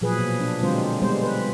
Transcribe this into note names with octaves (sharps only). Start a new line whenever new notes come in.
A#2 F3 F#3 G#4 B4
B2
D4
D3 F#3 G#3 C4 F4 C5
G3 G#3 B3 C5
B4